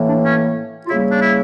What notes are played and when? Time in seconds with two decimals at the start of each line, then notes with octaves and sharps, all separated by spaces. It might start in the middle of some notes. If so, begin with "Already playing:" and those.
Already playing: A2 E3 A#3
0.09 D4
0.24 C#4
0.86 F4
0.89 C#3 E4
0.92 G3 A#3
1.12 D4
1.22 E4